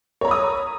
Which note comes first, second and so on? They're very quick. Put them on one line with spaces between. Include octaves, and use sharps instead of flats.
C#5 A#5 B5 D#6